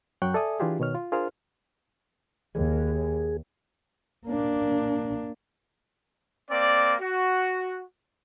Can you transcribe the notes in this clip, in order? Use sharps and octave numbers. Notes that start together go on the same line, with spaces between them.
F#2 F#3 G5 C#6 F#6 G6
A4 D5 E5 G#5 D#6
E3 D4 E4 F4 G4 G#4
B2 D#3 C#5 F6
F4
D4 F4 G#4 A#4 C5 F6
D#2 G#4
A#3 D4
A#3 C4 D5
F#4